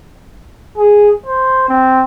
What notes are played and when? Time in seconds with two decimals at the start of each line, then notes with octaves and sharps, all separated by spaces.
0.78 G#4
1.26 C5
1.69 C4